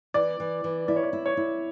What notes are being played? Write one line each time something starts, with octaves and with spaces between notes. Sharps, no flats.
E3 D5
E3
E3
E4 D5
C#5
D5
E4
C#5
E4